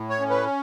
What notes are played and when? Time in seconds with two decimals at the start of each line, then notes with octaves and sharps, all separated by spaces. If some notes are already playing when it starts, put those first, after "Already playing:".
Already playing: A2
0.10 C#5
0.20 C#4
0.30 B4